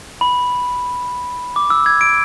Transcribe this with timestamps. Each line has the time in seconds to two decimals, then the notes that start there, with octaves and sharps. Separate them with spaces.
0.21 B5
1.56 D6
1.70 E6
1.86 G#6
2.01 D7